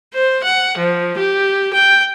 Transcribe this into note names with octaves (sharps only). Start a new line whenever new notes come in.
C5
F#5
F3
G4
G5